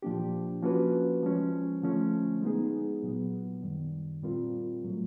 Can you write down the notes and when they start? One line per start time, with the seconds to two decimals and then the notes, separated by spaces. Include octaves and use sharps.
0.02 A#2 F3 A#3 D4 G4
0.62 F3 A#3 C#4 F#4 B4
1.23 F3 G#3 C#4
1.82 D3 F3 A3 C#4
2.42 G#3 B3 D#4 G#4
3.03 A#2 F#3 B3
3.63 F#2 D#3 G3
4.22 A#2 G3 C4 F4 A#4
4.83 A2 F#3 A3